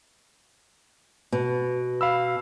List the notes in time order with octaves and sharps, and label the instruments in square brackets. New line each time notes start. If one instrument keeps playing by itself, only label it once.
[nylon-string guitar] B2
[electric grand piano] F5 B5 E6